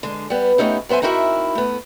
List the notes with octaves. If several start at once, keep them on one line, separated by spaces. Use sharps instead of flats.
D3 G#3
G3 B3
A3 B3 C#4 D#4 G4
F#2 B3 C5 E5 G#5
C4 D#4 E4 F#4 A#4 E5
A3 B3